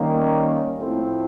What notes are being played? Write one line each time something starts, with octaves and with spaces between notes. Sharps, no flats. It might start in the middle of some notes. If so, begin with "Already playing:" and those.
Already playing: D#3 G3 A#3 C#4
A2 F3 A3 C4 E4